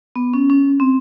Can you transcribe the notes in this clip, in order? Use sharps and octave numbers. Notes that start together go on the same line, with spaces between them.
B3
C#4
C#4
C4